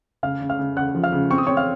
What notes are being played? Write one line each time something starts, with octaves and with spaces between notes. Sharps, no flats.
C#3 F5 F6
C#3
F5 F6
C#3
C#3 F#5 F#6
F3
F5 F6
C#3
C4 C#6
D#6
C4 C#5 C#6
F5 F6